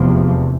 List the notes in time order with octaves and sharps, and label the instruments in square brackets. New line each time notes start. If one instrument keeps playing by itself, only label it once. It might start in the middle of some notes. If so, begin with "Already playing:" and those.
Already playing: [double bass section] F1 E2 C3 F3